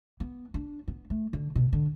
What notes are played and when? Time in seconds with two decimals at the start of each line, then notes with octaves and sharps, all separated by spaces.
0.20 B3
0.54 D4
0.88 B3
1.10 A3
1.33 D3
1.55 B2
1.73 D3